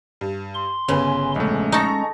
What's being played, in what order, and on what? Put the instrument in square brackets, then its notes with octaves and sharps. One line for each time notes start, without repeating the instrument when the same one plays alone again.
[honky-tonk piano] G2
[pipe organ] C6
[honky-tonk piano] G1 B4 G#5 [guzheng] C#3
[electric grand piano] A#1 A3 [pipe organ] G#3 C#4
[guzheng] D#4 A4 [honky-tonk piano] A#5 C#6 A#6